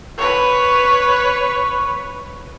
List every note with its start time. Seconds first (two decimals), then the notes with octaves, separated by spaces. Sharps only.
0.18 B4 C#5